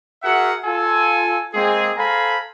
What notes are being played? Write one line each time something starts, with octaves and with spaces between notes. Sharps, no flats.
F#4 G#4 A#4 E5 F#5
F4 A4 G#5
G#3 A#3 C4 G#4
A4 C5 F5 G#5 A#5 B5